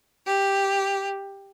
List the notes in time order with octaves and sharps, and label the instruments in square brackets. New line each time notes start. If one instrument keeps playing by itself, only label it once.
[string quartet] G4